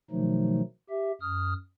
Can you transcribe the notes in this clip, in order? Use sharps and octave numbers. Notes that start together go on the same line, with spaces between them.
B2 D#3 F3 F#3 A3 D#4
G4 E5
F#2 D#6 F6